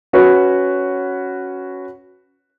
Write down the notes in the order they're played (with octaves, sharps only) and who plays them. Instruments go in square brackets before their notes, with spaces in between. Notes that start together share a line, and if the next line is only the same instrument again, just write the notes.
[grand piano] C#4 F#4 B4 C#5